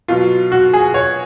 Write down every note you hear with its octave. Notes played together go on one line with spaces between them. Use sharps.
B2 F#3 F4
F#4
G#4
C#5